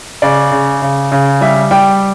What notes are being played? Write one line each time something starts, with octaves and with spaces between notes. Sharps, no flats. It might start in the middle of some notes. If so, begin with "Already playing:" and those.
C#3 D5
C#3
C#3
C#3
G3 E5
G3 G5